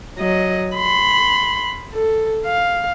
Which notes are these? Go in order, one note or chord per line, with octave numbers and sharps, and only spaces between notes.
F#3 D#5
B5 C6
A4
F5